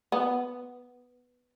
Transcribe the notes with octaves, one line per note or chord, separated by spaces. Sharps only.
B3